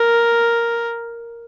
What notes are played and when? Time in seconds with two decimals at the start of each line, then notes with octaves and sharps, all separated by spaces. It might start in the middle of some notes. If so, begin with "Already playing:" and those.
Already playing: A#4